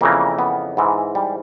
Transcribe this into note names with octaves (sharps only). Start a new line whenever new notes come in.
F2 C#3 E3 A#3
B3
G#2 E3
G3